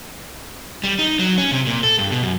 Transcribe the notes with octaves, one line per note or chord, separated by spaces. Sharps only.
G3
D#4
F#3
C#4
C3
A#2
A4
G2
B2
F#2